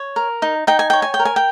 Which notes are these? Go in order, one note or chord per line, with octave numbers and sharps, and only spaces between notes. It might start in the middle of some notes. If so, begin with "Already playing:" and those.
Already playing: C#5
A#4
D#4
D#4 G5
G#5
C#5 G5
G#5
G5
A#4
G#5
G5